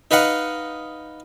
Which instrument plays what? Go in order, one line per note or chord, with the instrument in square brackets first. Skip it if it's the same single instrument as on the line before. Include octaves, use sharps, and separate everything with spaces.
[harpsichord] D#4 B4 D#5 F5 F#5